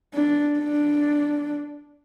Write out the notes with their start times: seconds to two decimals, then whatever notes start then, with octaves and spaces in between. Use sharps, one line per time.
0.14 D4
0.59 D4